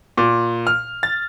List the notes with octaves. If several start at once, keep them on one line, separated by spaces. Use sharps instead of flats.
A#2
F6
A6